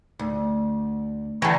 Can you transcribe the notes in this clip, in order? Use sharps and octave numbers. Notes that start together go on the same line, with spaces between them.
D2
D3 E3 G5 A5 A#5 C#6